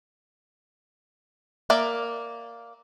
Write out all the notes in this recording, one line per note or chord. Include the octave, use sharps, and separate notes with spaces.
A#3 A#4 D5 E5